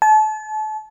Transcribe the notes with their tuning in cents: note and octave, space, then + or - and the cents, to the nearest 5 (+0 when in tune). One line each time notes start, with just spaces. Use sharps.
A5 -35